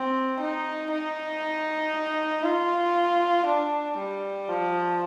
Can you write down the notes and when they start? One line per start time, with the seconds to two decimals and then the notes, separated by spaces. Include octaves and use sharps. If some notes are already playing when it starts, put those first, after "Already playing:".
Already playing: C4
0.40 D#4
0.91 D#4
2.44 F4
3.46 D4
3.97 G3
4.48 F3